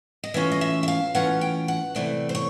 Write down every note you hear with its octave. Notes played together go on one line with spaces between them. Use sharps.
D#5
E3 A3 C#4 F4 E5
D#5
E5
E5
F5
E3 A3 C#4 F4 F#5
G5
F#5
C3 E3 A3 C4 D5
C5
C#5